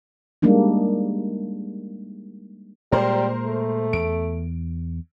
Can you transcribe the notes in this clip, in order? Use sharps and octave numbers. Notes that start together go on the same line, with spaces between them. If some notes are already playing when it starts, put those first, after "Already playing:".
G3 G#3 A#3 D4 D#4
A#2 G3 G#3 A#4 C5
A3
E2 D7